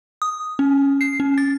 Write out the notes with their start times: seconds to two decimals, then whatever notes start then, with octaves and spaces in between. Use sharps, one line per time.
0.22 D#6
0.59 C#4
1.01 C7
1.20 C#4
1.38 A6